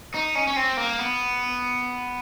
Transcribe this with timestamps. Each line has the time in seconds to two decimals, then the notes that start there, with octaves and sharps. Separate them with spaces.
0.14 D#4
0.35 C#4
0.47 C#4
0.56 C4
0.77 A#3
0.99 B3